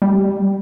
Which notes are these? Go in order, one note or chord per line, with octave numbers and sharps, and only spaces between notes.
G3